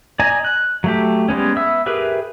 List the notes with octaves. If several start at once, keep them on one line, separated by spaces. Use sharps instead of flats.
D5 D#5 G#5 A#5
F#6
F#3 A3 G4
G3 G#3 B3 C#4
B3 E5 E6
G4 G#4 A#4 B4 E5